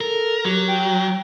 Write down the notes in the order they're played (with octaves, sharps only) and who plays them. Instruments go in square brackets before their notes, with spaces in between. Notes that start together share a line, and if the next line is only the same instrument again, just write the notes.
[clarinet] A4 [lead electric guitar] A#4
[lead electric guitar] F#3 [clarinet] G4
[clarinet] G5